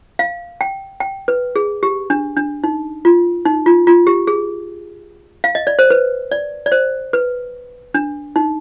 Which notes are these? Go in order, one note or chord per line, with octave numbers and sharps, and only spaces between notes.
F5
G5
G5
B4
G#4
G4
D4
D4
D#4
F4
D#4
F4
F4
G4
G#4
F5
D#5
D5
C5
B4
D5
D5
C5
B4
D4
D#4